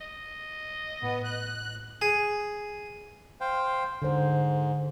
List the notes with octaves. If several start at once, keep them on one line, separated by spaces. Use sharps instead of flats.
D#5
A2 B3
F#6
G#4
C5 F5 G5
G#2 D3 C5